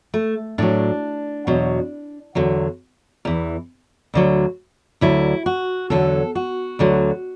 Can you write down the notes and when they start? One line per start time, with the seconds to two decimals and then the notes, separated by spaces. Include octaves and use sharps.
0.14 A3
0.58 A2 F#3 D4
1.47 E2 B2 F#3
2.35 E2 D3 F#3
3.25 E2 E3
4.14 D2 D3 F#3
5.01 D2 D3 F#3 E4
5.46 F#4
5.90 E2 D3 F#3 A4
6.35 F#4
6.79 D2 D3 F#3